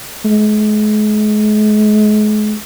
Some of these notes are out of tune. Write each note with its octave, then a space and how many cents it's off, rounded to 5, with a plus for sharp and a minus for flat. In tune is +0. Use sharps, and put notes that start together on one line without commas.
G#3 +40